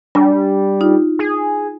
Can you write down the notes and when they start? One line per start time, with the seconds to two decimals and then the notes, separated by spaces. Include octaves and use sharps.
0.15 G3 D4 G#5
0.81 D#4 F4
1.19 G#4